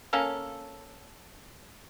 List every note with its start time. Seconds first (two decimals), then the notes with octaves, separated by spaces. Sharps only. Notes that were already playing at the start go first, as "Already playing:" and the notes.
0.13 A#3 C#4 A4 F5